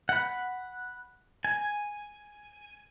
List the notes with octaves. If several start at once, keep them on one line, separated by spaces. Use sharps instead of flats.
F#5 B5
G#5